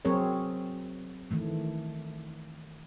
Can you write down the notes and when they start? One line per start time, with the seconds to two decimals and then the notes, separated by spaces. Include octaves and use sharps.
0.05 F#3 C4 G#4 A#4 C#5
1.31 D#3 E3 A3